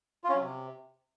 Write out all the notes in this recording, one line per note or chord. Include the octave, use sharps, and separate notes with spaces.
F4
C#4
F#3
C3